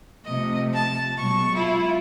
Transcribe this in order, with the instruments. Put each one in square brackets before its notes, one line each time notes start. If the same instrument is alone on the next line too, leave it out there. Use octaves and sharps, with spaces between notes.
[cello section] C3 F3 A3 [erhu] D#5
[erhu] A5
[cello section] B2 F#3 G#3 [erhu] C#6
[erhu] E4 [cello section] F4